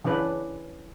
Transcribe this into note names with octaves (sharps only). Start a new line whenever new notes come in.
C#3 E3 C#4 D4 B4